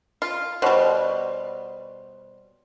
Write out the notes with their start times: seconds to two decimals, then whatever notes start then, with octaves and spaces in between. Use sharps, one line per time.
0.22 F4
0.62 B2 G3 C5 C#5 C6